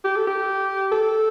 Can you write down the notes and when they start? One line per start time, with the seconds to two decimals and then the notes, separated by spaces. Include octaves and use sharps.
0.04 G4
0.16 A4
0.27 G4
0.92 A4